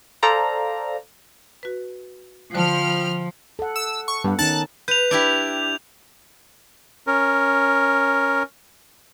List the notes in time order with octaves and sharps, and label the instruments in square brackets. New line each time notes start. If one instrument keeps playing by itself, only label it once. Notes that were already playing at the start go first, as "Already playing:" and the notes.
[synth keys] A4 C5 D5 F5 A#5
[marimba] F#4 B4
[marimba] D3 C5 A5 [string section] F3 [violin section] G5 B5 F6
[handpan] A4 F#5
[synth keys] E6
C#6
[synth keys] G2 [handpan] B3 F#5
[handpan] D#3 C#4 D#4 [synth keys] A5 F#6 A6
[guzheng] B4 [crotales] G6 F7
[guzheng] D4 E4 G4
[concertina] C#4 A#4